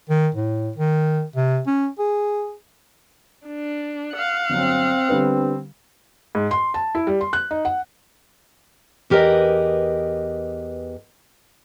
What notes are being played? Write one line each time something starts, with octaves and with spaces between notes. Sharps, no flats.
D#3
A2
D#3
C3
C#4
G#4
D4
F5 F#5
G1 F#3 C4
D3 G3 B3
G#2
C6
A5
E4
G3
C6
F#6
D#4
F#5
E2 G4 A#4 B4 D#5